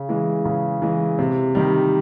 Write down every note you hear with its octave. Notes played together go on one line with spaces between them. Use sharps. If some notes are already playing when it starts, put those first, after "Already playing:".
Already playing: C#3
E3 G#3
C#3
E3 G#3
C3
D#3 G3